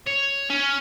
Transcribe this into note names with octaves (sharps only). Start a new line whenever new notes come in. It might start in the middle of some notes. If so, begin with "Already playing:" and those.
C#5
C#4